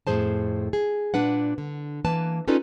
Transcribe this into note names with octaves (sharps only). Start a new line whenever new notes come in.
F2 A2 F#3 G#4 C5 A5
G#4
A#2 D4 B4 F#5
D3
E3 A#3 B4 A5
C#4 D#4 F4 A4 B4 D5